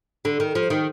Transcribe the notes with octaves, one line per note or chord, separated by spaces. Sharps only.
D3
D#3
F3
D#3